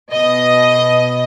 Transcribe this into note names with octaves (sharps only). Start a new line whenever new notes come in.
B2 D#5